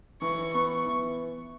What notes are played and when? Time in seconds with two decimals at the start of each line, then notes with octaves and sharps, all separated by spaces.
0.21 E3 C#6
0.54 B3 C#6
0.86 E3